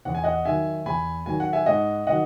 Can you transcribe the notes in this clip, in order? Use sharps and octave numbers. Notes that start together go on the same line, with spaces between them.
E2 F#5
G#5
D#5 F#5
D#3 F#3 E5 G#5
E2 G#5 B5
D#3 F#3 G#5
F#5
E5 G#5
G#2 D#5 F#5
D#3 F#3 D#5 F#5